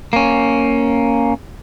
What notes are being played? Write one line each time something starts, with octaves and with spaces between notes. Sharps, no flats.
A#3 C#4